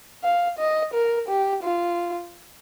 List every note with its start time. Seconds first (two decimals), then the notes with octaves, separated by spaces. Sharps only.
0.23 F5
0.58 D#5
0.93 A#4
1.29 G4
1.63 F4